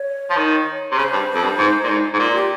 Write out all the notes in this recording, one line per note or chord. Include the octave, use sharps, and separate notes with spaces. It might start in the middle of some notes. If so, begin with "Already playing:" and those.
Already playing: C#5
F3
D#3
C3
C#3 C#5
C5
G2
F2
G2
G#2
A#2
G#2
G#2
A#2 F4
G4